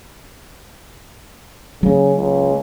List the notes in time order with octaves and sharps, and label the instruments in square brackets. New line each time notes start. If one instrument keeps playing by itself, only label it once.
[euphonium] C#3 [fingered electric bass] F#3 A#3
[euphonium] C#2